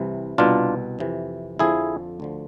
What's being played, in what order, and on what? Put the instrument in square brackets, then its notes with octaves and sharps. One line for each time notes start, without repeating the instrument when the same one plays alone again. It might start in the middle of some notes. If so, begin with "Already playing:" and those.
Already playing: [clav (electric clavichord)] C2 C3 E3
C2 B2 D4 F4
F2 C3 E3
F2 D3 F3 E4 G#4
D2 D3 F3